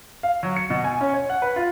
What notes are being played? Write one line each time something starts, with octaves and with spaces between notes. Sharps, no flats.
F5
F#3
C#7
B2
G#5
C#4
C#5
F#5
B4
F4